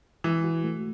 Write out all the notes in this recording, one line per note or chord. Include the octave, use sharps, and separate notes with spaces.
E3 G#3
F#4
A3